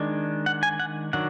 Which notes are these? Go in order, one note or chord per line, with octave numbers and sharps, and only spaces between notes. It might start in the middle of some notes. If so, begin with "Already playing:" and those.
Already playing: D#3 G#3 D4
F#5
G#5
F#5
D#3 F#3 D4 F#5